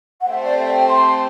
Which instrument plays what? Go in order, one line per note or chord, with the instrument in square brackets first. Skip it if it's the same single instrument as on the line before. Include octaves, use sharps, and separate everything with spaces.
[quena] F#5
[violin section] A3 C4 G4 C5 [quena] E5
[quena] D5
E5
G5
C6